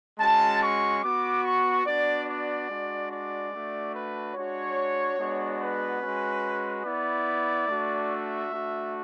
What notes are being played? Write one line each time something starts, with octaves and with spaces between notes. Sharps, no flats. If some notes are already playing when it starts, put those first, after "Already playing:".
G#3 C#4 F#4 A5
C#6
B3 F#4 D6
C#6
B3 D4 F#4 D5
D5
G#3 D4 F#4
D5
A3 D4 F#4
B4
G#3 D4 F#4 C#5
G#3 B3 D4 F#4
B4
G#3 C#4 F#4
B3 E4 D5
A3 D4 F#4
E5
A3 D4 F#4